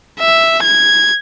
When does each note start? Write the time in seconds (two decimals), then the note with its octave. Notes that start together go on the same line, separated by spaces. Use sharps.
0.19 E5
0.63 G#6